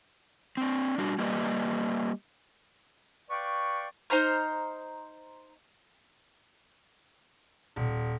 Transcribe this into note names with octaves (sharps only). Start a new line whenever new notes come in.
C4 D4
G3 D4 F#4
G3 A#3 G4 B4 D5 D#5
B4 D5 F5 G5 C#6
D#4 C5 A#5 F6
D#1